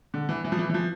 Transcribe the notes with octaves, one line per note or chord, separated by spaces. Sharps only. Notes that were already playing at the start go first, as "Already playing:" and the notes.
D3
E3
E3
F3
E3
E3
F3